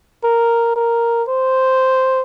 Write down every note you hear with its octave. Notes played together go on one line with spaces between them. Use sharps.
A#4
A#4
C5